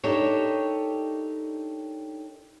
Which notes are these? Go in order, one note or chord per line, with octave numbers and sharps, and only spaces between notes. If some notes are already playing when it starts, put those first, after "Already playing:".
D4 D#4 G4 A4 A#4 C#5